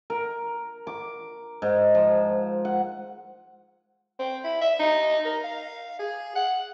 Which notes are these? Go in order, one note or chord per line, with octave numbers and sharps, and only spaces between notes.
A#4
D6
G#2
F3
F#5
C4
E4
E5
D#4
A#4
F5
G#4
F#5